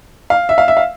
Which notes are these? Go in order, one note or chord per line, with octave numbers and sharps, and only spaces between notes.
F5
E5
F5
E5
F5